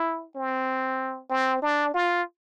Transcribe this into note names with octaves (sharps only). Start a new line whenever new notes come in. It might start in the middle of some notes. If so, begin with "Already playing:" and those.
Already playing: E4
C4
C4
D4
F4